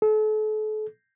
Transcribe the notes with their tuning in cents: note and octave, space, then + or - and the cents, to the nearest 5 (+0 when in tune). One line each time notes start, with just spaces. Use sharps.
A4 -40